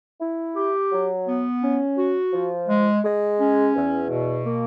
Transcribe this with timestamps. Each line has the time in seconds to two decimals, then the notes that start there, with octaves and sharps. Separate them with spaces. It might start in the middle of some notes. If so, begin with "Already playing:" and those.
0.20 E4
0.56 G4
0.92 F#3
1.27 B3
1.63 C#4
1.97 F#4
2.33 F3
2.69 G#3
3.04 G#3
3.40 C#4
3.75 E2
4.10 B2
4.46 A#3